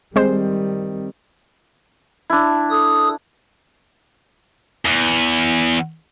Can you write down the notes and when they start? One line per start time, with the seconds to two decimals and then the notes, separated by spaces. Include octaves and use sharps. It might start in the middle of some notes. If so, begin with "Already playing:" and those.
0.16 D#3 G3 G#3 C4 C5
2.30 D4 E4
2.71 A4 D#6
4.85 E2